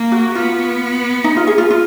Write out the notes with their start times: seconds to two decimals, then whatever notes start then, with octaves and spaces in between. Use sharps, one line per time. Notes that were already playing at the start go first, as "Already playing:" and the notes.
Already playing: A#3
0.12 F#4
0.35 B3 F4
1.24 D#4
1.36 F4
1.47 G#4
1.58 F4
1.70 F4